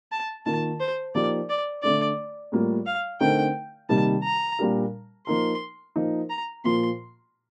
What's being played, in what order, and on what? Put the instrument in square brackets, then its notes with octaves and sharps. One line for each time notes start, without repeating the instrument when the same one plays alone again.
[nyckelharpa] A5
[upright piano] D#3 A#3 F4 A#4 [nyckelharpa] A5
[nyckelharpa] C5
[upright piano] F3 A#3 D#4 G4 [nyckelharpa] D5
[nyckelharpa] D5
[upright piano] D3 A3 D4 [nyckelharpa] D5
[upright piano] A2 G3 A#3 F4
[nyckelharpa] F5
[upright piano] D3 A3 C4 D#4 A#4 [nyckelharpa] G5
[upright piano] C3 D#3 G3 A#3 D#4 [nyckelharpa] A5
[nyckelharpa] A#5
[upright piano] A#2 G3 D4 G4 A#4
[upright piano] F3 A#3 D#4 A#4 [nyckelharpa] C6
[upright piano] F3 A#3 D#4 A#4
[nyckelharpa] A#5
[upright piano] A#2 F3 A#3 F4 [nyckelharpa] C6